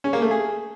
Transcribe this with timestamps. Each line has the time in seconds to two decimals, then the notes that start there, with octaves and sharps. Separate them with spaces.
0.04 C#4
0.13 A#3
0.22 A3
0.31 G#4